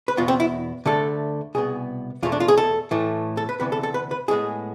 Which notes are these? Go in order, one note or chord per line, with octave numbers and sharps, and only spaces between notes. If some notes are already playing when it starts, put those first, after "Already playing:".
B4
E2 B2 B3 F4
C4
E4
D2 D3 A3 A4
C2 B2 B3 G#4
E2 B2 A3 F4
D4
F4
G#4
A4
A2 E3 A3
A4
B4
D2 C3 E3 B3 B4
A4
A4
B4
B4
A2 G#3 B3 G#4